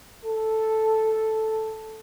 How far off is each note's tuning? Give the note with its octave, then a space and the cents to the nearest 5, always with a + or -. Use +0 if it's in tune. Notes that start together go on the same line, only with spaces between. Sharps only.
A4 +0